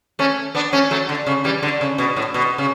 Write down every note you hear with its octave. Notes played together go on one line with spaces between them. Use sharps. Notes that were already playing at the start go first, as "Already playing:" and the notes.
A3 C#4
B3 D4
A3 C#4
F#3 A3
D3
C#3
E3 G3
D3
C#3
B2
A2
B2
C#3